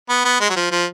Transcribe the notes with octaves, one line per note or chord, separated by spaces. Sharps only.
B3
B3
G#3
F#3
F3
F3